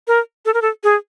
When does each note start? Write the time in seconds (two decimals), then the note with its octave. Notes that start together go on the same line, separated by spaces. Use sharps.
0.08 A#4
0.45 A4
0.54 A#4
0.62 A4
0.84 G#4